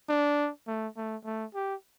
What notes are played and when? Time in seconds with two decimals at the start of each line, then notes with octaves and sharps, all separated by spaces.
0.09 D4
0.67 A3
0.96 A3
1.25 A3
1.54 G4